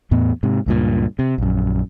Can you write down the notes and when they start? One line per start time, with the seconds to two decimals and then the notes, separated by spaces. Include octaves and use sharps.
0.11 E2 A2 B3
0.43 G#2 C3
0.66 C#2 G2 A#2
1.19 C3
1.38 A#1 F#2